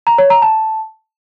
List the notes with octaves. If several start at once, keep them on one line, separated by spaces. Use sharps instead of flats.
A#5
C#5
A#5
A5